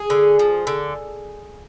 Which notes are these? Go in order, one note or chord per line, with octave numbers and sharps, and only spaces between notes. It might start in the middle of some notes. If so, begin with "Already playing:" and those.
Already playing: G#4
D3
F3
D3